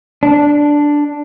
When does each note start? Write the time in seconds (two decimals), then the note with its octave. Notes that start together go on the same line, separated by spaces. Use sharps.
0.23 D4